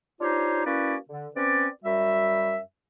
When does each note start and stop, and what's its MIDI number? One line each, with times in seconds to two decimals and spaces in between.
0.21 0.65 62
0.21 0.65 63
0.21 0.65 65
0.21 0.65 67
0.21 0.65 72
0.21 0.65 73
0.65 0.95 58
0.65 0.95 61
0.65 0.95 64
0.65 0.95 66
0.65 0.95 71
0.65 0.95 74
1.08 1.28 50
1.35 1.67 60
1.35 1.67 61
1.35 1.67 71
1.35 1.67 74
1.84 2.58 42
1.84 2.58 55
1.84 2.58 66
1.84 2.58 76